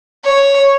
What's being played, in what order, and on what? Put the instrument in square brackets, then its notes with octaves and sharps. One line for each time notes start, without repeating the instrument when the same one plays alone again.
[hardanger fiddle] C#5